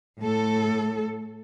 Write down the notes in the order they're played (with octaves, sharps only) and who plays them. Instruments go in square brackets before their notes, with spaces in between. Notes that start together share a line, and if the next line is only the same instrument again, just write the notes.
[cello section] A2 A4